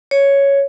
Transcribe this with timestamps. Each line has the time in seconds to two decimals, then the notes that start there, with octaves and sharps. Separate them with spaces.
0.11 C#5